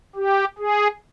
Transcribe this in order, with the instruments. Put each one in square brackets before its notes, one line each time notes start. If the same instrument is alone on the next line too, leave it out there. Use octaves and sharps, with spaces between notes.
[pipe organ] G4
G#4